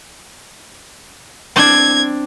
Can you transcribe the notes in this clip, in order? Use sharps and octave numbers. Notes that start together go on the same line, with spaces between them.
C4 D4 G#6